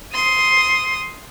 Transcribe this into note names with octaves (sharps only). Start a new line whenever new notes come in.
C6 D#6